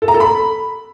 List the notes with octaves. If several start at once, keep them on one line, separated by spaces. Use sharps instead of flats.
A4
A#5
A4
B5